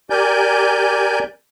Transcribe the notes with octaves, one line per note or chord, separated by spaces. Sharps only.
G4 A#4 D5 G#5 G6